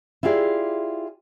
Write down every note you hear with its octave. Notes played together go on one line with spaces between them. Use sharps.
E4 F4 G4 G#4 D5